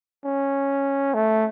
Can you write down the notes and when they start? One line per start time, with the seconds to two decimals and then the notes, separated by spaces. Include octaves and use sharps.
0.25 C#4
1.14 A3